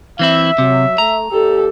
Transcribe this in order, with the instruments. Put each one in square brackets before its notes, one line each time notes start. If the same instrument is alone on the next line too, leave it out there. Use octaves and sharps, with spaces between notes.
[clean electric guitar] E3 C4 E4 [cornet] E5
[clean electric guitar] C3 [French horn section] F#3
[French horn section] A3 [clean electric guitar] A#5
[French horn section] D#2 G4 [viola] A4